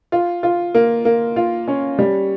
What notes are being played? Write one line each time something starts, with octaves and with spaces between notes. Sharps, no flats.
F4
F4
A#3
A#3
F4
C#4
G3